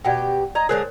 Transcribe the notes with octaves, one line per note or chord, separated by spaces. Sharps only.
B2 G4 D5 F#5 G5
D5 D#5 A#5
D3 G#3 G#4 A#4 C5 C#5